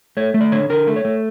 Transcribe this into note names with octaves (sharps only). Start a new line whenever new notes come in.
A3 C#5
A3
D5
D3 C#5
D3 A#4
A3
C#5
A3